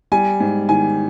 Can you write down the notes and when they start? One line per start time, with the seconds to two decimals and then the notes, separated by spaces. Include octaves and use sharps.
0.12 G3 G#5
0.40 G#2
0.69 D#3 G#5